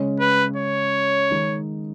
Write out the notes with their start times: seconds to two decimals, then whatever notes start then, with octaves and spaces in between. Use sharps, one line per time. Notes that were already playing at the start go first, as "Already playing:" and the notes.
Already playing: C#3 G#3 C#4
0.20 B4
0.56 C#5
1.30 D#3 G#3 D#4